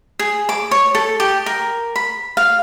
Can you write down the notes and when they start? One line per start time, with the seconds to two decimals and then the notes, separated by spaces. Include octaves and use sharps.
0.19 G#4
0.49 D6
0.71 C#5
0.95 A4
1.20 G4
1.46 A#4
1.96 B5
2.37 F5